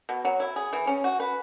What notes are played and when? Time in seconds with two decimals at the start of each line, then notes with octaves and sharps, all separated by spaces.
0.09 B2
0.25 F#3
0.40 E4
0.56 G#4
0.73 E3
0.87 C#4
1.04 F#4
1.20 B4